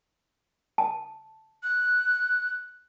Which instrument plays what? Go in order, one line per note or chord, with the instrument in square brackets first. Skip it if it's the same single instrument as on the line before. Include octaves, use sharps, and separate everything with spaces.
[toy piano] A5
[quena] F#6